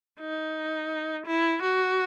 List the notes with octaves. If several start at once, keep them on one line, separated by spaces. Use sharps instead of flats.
D#4
E4
F#4